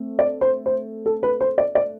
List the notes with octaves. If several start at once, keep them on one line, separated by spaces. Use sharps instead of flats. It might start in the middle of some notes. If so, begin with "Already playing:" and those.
Already playing: A3 C4
D5
C5
C5
A4
B4
C5
D5
D5